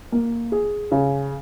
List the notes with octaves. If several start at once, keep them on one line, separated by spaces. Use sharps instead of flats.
A#3
G#4
C#3